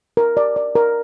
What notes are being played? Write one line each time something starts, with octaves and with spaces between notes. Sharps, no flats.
A#4
D5
D5
A#4